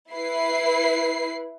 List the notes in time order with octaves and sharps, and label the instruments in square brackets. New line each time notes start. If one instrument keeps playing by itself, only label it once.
[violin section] E4 B4 C7